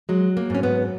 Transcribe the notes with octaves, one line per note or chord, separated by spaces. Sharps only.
F#3 G#3
A#3
G#2 C#4
B3